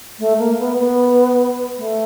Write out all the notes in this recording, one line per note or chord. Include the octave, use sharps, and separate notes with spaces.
A3
A#3
B3
B3
A3